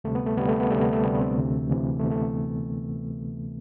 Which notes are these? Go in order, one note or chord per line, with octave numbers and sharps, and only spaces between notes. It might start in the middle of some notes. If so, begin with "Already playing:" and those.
D2 C3 G3 A3
B3
A3
D2 C3 G3 B3
A3
B3
D2 C3 G3 A3
B3
A3
D2 C3 G3 B3
D4
A3 C4
D2 C3 E3
D2 C3 E3
A3
D2 C3 E3 B3
A3